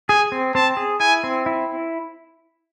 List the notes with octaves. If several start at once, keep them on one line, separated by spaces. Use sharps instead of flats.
G#4 G#5
C4
C4 A5
G#4
E4 G#5
C4
E4